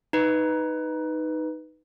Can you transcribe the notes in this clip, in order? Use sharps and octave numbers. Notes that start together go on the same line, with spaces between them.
D#4 B4